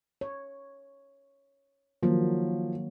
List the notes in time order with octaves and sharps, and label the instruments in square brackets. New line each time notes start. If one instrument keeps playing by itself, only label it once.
[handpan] C#5
[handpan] D#3 F#3 A#3 [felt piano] F3